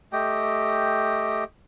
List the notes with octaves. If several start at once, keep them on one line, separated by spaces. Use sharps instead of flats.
A3 G4 D#5 G5